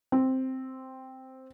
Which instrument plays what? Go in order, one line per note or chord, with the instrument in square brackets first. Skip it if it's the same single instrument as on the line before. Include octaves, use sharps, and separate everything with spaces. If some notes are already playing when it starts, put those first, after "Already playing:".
[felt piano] C4